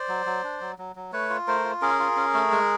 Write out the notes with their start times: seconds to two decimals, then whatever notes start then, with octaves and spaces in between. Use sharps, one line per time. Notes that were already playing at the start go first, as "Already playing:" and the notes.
Already playing: C5 D5
0.09 F#3
0.26 F#3
0.44 D4
0.61 F#3
0.79 F#3
0.96 F#3
1.13 A3 B4 C#5
1.30 F4
1.47 A3 A#4 C5
1.64 F4
1.82 C#4 G#4 A#4
1.99 F4
2.16 C#4
2.34 A3
2.51 G#3